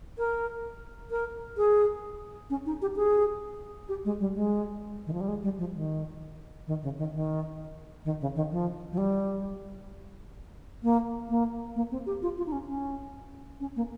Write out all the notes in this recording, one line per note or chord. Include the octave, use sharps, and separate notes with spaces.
A#4
A#4
G#4
C#4
D#4
G4
G#4
G4
G#3
G3
G#3
D#3
F3
G3
G#3
G3
F3
D#3
D#3
C#3
D#3
D#3
D#3
C#3
D#3
F3
F3
G3
A#3
A#3
A#3
C4
G4
F4
F4
D#4
C#4
C#4
C#4
A#3